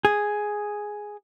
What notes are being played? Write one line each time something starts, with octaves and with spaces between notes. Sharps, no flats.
G#4